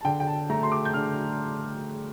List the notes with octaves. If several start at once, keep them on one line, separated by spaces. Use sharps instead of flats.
A5
D3 G5
G5
A5
A3 A#5
C6
D6
G6
D3 F6